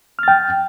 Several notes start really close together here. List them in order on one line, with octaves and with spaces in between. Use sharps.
F6 A6 G5